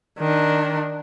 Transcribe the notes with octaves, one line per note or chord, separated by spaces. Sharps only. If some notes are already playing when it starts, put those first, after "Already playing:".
D#3 D4